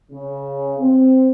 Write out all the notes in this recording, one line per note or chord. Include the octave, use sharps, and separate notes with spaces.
C#3
C4